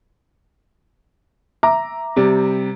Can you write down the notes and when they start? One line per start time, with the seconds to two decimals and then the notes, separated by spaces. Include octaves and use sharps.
1.63 E5 A#5 D6
2.16 C3 G3